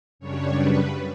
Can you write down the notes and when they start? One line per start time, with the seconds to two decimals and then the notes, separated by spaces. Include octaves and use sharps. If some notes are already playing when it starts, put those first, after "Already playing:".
0.19 F#2 C#3 G3 D4 C#5
0.55 B4